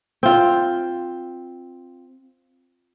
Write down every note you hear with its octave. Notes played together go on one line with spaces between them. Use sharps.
C4 F4